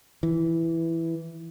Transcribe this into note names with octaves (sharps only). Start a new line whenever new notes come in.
E3